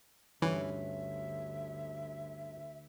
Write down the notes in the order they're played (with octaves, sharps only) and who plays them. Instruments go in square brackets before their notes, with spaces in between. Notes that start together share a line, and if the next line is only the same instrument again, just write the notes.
[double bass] D2 [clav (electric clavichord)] G2 C#4 [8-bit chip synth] E3 [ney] E5